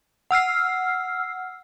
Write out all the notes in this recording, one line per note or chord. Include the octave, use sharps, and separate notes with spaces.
F#5 E6 F6 C7